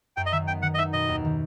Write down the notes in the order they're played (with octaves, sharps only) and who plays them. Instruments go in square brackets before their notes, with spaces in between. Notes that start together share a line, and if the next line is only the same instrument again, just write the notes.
[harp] F#2 [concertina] G5
[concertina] D#5
[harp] D#3 [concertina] E5
[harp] B3 [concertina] G5
[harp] D#3 [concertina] F#5
[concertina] D#5
[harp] D#4 [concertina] E5
[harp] B2 [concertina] D#5
[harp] D#2
D#3